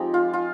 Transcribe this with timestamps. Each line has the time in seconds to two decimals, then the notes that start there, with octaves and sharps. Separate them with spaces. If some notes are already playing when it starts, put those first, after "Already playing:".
Already playing: F3 G#3 C4 D#4 G4
0.14 F4
0.33 F4